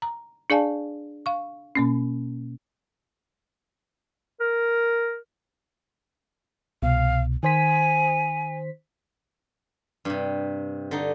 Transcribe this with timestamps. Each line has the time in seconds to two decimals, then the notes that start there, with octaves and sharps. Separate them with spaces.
0.02 A#5
0.50 D4 G#4 D5 F5 G#5 A5
1.26 F5 C#6
1.75 B2 A#3 C#4
4.40 A#4
6.82 C2 B2 F5
7.43 D#3 C5 G#5 B6
10.05 G2 C3
10.91 D3 D#4